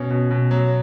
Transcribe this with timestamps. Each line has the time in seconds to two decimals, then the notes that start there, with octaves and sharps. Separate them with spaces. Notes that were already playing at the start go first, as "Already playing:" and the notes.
Already playing: B2 C#4
0.10 B2
0.31 B2
0.51 F#3